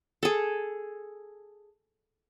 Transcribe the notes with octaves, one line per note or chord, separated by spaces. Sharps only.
G#4 A4